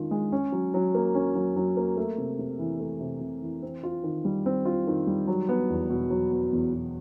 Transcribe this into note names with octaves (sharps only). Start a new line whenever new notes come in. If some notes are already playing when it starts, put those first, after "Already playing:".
Already playing: D#3 G#3 C#4 F4
G#3
C#4
F#3
F#3
A#3
C#4
F#3
F#3
A#3
A3
C3
C3
E3
A3
C3
C3
E3
C4
F4
D#3
G3
C4
F4
D#3
G3
F#3
B3
E2
B2
F#3
B3
E2
B2